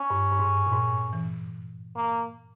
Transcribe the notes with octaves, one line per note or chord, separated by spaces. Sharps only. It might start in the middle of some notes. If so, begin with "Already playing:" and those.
Already playing: C#4
G2
G2
G#2
G2
A#2
G#2
E3
A#3